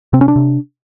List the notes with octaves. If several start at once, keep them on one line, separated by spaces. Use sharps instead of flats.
C3 C4
C#4
D4
C3